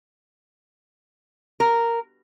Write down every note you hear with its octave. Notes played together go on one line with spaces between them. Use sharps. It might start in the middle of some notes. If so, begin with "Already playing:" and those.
A#4